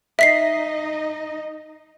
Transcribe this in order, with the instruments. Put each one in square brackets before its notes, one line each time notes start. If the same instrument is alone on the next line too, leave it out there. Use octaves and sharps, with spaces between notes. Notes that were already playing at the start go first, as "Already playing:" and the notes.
[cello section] D#4 D#5 [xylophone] E5 B6 C7